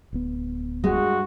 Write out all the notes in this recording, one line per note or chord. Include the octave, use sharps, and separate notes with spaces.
D1 B3
G2 G#3 F#4